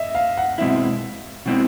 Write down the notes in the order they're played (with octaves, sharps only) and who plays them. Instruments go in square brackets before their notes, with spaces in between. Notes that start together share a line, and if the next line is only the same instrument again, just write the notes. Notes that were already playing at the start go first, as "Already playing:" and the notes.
Already playing: [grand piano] D#5 E5
F5
F#5
[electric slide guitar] B2 G#3 C4 E4 [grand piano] E5
[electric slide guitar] B2 G#3 C4 E4